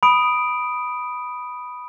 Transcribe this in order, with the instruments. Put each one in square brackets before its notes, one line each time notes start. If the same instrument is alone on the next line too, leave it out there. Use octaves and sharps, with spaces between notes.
[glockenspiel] B5 D#6 D7